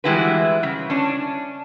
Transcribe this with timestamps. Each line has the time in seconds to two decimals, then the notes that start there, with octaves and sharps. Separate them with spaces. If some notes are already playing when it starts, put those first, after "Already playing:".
0.04 E3 G3 G#3 E4 F#4 B4
0.63 C#3
0.90 C#4 D4